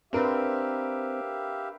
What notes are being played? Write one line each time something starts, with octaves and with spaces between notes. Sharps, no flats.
C4 D4 G4 A#4 B4 E5 F5